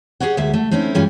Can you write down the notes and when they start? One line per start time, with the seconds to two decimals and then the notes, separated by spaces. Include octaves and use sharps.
0.20 G4 G#4 B4 C#5 F#5
0.37 D2 G3 G#3 A#3 E5
0.54 A3
0.71 A3 C4 C#4 D#4 E4
0.95 G2 E3 G3 G#3 C#4 F4